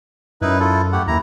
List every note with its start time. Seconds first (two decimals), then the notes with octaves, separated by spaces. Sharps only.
0.42 F#2 D#4 E4 B4
0.60 E4 F4 A4
0.92 A3 G4 F#5
1.07 D#2 E4 A#5